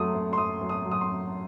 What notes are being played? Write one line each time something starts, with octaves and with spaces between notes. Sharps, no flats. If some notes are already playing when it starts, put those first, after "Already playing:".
Already playing: F#2 F#3 A3 C6 D#6
F#2
C6
F#2 D#6
F#2
D#6
F#3
D#6
C6